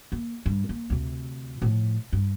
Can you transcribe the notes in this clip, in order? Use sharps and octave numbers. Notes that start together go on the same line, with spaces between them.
A#3
G2
A#3
D2 C3
A2 F3
G2